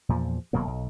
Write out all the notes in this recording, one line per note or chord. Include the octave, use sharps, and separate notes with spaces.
E2 A#2 F3
D#1 B2 F#3 A#3
B1